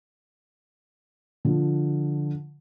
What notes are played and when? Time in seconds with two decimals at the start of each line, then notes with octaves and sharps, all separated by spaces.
1.45 D3 F3